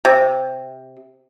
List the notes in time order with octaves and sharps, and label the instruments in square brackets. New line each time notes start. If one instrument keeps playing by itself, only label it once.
[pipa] C3